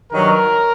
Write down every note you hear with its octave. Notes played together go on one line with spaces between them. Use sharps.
G2 D#3 F#3 A#4